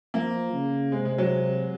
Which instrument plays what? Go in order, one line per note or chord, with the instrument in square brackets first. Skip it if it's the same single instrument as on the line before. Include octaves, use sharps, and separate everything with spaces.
[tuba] F3 [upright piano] A#3
[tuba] C#3
[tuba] C3 [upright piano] G#3
[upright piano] G#3
F#3